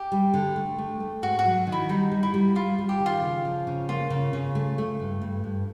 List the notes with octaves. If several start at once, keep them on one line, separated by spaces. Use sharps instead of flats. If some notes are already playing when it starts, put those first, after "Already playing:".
Already playing: G4
G3
D3
A3
A3
A3
G#2 F#4
F#4
F#3
D#3
E4
G3 D#4
G3
E4
G3
G3 F4
G3
G4
D#3
F4
C#3
F3
C#3
A#3 F4
C#3
C#3
A3
A3
G2
G2
G2